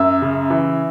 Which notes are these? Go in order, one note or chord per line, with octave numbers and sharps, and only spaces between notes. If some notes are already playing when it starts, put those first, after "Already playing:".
Already playing: F#2 E5
C#3
E3